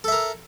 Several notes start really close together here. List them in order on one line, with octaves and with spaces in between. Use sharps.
A4 E5 A#4